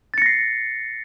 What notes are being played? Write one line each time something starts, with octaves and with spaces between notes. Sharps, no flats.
A6 A#6 C7 C#7